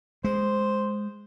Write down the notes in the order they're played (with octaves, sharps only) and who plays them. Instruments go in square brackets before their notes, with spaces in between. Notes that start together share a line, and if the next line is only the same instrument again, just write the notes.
[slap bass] G#3 [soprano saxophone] C5